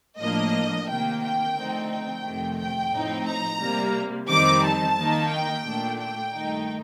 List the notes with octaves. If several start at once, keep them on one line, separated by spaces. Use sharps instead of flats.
A2 F3 A#3 D4 D#5
C3 D#3 A#3 G5
G5
D3 F3 A3 C4 D#4
G5
F2 C3 D#3 A3
G5
A2 F3 C4 D#4
A#5
C3 G3 A#3
F2 D#3 G3 C4 D#4 D6
A5
D#3 A#3 D#4
G5
A#2 A3 D4
G5
G2 D#3 A3 D#4